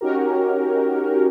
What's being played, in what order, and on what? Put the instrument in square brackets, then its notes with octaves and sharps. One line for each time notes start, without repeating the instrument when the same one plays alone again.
[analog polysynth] C#4 D#4 F#4 G4 A#4